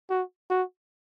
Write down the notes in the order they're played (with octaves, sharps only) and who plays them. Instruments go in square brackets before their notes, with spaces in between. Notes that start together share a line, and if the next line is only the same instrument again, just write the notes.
[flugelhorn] F#4
F#4